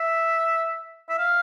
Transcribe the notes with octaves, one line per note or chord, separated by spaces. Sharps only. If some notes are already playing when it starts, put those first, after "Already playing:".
Already playing: E5
E5
F5